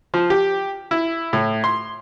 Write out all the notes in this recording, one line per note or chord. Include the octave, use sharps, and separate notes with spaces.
F3
G4
E4
A2
C6